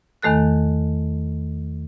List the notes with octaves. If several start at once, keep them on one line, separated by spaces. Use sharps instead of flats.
E2 D#3 A3 A4 F#6